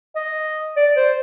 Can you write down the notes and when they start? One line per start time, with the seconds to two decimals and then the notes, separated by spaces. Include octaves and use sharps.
0.16 D#5
0.77 D5
0.97 C5